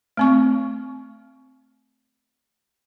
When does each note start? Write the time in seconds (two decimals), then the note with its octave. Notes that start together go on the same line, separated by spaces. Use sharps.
0.17 A3 C4 C#6